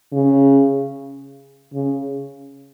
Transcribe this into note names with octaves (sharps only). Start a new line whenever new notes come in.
C#3
C#3